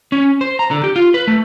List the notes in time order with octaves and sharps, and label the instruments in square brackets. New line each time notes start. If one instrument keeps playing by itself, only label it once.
[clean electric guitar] C#4
C5
A#5
D3
G4
F4
B4
A3